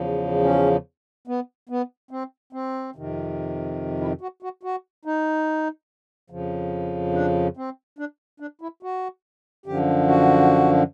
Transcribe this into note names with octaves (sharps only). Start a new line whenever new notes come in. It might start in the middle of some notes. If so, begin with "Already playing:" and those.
Already playing: E2 C#3 F3
C#4
B3
B3
C4
C4
F2 C3 D#3
E4
F#4
F#4
F#4
D#4
F2 C#3 F3
D4
C4
D4
D4
E4
F#4
F#2 D3 F3 G4
F#4